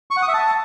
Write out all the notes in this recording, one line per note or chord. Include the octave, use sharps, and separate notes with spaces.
C#6
F#5
D#6
E5
A5